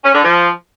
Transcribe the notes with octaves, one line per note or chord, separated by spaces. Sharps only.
C#4
D3
F3